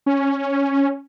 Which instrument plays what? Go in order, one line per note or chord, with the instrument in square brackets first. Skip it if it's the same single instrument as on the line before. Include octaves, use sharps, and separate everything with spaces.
[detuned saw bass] C#4